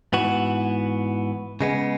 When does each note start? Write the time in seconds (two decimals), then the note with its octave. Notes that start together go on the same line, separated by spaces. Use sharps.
0.13 G#2 E3 B3 F#4
1.61 C#3 G#3 B3